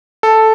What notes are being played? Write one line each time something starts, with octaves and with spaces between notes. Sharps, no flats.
A4